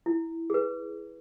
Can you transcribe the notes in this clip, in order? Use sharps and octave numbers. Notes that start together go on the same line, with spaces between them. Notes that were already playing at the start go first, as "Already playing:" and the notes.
E4
G#4 B4